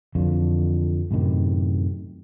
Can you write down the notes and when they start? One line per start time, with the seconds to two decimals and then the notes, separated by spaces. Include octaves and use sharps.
0.15 F2 D3 E3 F3
1.11 F#2 A2 C3 D#3